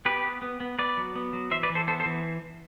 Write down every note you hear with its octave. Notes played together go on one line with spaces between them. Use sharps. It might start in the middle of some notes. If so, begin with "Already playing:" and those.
B3 G4 B4
B3
B3
B3
B3 B4 D5
F#3
B3
F#3
E3 C5 E5
B4 D5
E3
A4 C5
B3 A4 C5
A4 C5
E3